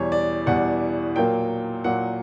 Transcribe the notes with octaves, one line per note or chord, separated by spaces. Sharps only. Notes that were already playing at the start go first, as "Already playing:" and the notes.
Already playing: E2 B2 G3 C#5
D5
E2 B2 G3 F#5
A#2 F#3 A#3 G5
A#2 F#3 A#3 F#5